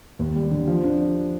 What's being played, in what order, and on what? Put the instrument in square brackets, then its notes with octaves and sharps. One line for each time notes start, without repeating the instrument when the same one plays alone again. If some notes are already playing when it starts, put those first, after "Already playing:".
[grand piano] D#2
G3
D3
F3
D4